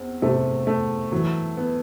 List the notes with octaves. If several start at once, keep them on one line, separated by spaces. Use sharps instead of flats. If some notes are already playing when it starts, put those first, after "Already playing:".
Already playing: E2 C4
C3 A3
A3
E3 F#3
B3